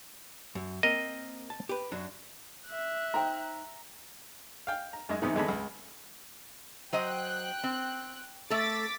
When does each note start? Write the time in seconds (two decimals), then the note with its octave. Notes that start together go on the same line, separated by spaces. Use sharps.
0.55 F#2
0.83 A#3 C4 A#4 D#5
1.50 A5
1.69 G4 B4
1.92 F#2 F#3 D4
2.68 E5 F#6
3.14 D#4 C5 G5 A#5
4.67 F5 G5
4.93 A#5
5.09 F#2 G#3 D#5
5.22 E2 G#2 C3 D#3
5.35 G#1 E2 D3 G#3 A5 B5
5.48 C#2
6.93 F#3 C5 D#5 G5 F#6
7.64 C4
8.50 A3 A4 D6 A6 B6